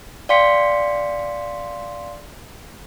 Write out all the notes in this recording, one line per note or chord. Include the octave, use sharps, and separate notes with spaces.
D5 F5 G5 C6 B6 C#7